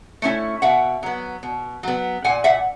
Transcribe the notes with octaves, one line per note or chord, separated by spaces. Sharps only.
A3 C#4 E4
B2 E5 F#5
F#3 B3
B2
F#3 B3
A#2 F#5 G#5
E5 F#5